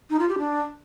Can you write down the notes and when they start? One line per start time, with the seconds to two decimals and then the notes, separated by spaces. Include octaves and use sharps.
0.10 D#4
0.19 F4
0.29 G4
0.38 D4